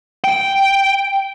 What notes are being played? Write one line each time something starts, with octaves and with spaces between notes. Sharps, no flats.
G5